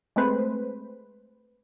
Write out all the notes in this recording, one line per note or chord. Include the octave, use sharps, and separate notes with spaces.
G#3 A3 C4 B4 C5